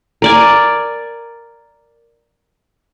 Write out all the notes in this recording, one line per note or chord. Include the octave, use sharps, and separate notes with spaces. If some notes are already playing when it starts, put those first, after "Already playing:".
A#4 D5 G#5